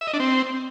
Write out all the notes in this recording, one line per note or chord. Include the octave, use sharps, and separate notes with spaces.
E5
D#5
D4
C4